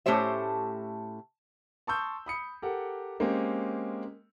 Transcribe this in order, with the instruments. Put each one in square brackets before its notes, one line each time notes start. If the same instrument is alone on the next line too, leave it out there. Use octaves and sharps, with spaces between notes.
[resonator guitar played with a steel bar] A2 A3 C#4 G4 C5 E5
[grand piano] A5 C6 C#6 D#6 E6 G6
B5 D#6 C#7
G4 A4 A#4 F#5
G#3 A#3 C4 C#4 G4